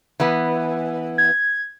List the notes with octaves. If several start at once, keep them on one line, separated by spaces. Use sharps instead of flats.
E3 B3
G#6